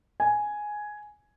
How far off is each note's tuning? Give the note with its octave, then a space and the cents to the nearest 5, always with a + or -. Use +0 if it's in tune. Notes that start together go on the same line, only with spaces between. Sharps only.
G#5 +5